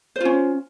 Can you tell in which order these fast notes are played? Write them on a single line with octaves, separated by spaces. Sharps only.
C5 F4 C#4